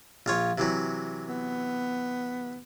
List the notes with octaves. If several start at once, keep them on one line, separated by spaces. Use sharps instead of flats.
A#1 F4 C#5
C3 E3 F#3
B3